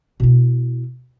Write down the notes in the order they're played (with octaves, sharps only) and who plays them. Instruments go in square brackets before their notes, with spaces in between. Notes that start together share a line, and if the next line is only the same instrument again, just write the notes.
[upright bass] B2 E4